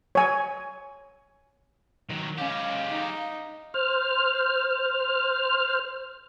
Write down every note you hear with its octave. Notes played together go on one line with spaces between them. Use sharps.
C#5 G#5
D#3 F#3
G#3 C#4 G4 F5
D#4
C5 F6